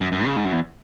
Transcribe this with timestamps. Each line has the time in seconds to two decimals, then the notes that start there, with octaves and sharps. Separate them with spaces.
0.01 F#2
0.12 F#2
0.25 C#3
0.36 G#2
0.45 F#2
0.52 E2